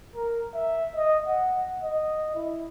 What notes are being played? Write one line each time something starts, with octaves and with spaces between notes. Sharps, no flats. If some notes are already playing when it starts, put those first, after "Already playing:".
A#4
E5
D#5
F#5
D#5
E4